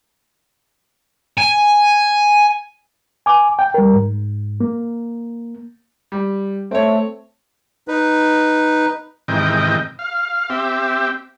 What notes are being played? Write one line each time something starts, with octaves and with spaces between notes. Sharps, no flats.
G#5
G#5 D6
G5
G3 A#4
G#2
A#3
G3
A3 C4 C#5
D#4 B4
G#2 C3 D#3 E3 D#5 G5
F5
C4 G4 E5